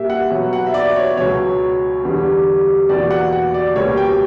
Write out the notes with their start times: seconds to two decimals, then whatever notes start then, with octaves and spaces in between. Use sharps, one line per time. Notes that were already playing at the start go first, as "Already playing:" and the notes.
Already playing: A#2 G3 A#3 E5
0.10 F#5
0.31 B2 F#3 B3
0.53 F#5
0.67 E5
0.74 D5
0.96 C#5
1.17 C#2 B2 F#3 B3 C#5
2.03 E2 D3 G3 B3
2.89 E2 B2 A#3 D5
3.11 F#5
3.33 F#5
3.54 D5
3.75 C#2 B2 G3 A#3 C#5
3.97 G5